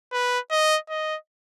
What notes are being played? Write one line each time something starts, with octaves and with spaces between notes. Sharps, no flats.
B4
D#5
D#5